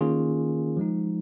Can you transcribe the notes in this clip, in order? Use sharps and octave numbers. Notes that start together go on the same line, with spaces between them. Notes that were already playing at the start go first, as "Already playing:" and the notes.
D#3 A#3 C#4 F4 G#4
F3 G#3 D#4